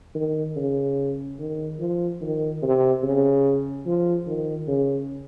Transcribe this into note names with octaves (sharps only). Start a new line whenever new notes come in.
D#3
C#3
D#3
F3
D#3
C3
C#3
F3
D#3
C#3